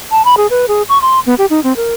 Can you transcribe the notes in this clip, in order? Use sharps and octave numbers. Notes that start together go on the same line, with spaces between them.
A5
B5
G#4
B4
G#4
C#6
C6
B3
G4
D#4
C4
A#4